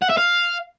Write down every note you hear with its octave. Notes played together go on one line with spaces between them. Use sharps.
F#5
E5
F5